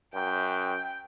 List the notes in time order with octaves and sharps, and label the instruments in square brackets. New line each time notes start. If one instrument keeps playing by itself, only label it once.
[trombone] F#2 [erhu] G5